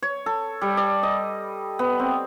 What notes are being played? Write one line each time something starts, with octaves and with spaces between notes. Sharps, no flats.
C#5
A4
G3
D5
D#5
B3
C4